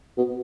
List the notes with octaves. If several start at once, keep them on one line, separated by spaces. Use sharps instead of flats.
B2